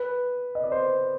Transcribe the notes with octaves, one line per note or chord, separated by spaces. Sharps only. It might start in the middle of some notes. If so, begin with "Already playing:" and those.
Already playing: B4
D#5
D5
C5